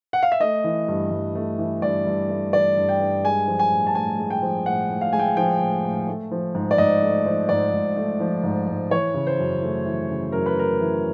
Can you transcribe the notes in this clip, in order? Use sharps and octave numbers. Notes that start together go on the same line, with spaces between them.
F#5
F5
E5
A3 D#5
E3
G2
G2
A3
E3
G2 D5
G2
A3
E3 D5
G2
G5
G2
G#3 G#5
F3
G#5
A2
A5
A2 G#5
G#3
G5
F3
A2 F#5
A2
F5
G#3 G#5
G5
F3 G5
A2
A2
A3
F3
G#2
D5
G#2 D#5
A3
F3
G#2 D5
G#2
A3
F3
G#2
G#2
E3 C#5
C#3
C5
F#2
A3
E3
C#3
F#2 A#4
B4
A3 A#4
E3